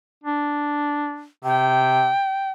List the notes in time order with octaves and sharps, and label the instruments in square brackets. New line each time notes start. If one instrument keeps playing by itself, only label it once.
[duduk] D4
[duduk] C3 [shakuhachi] G5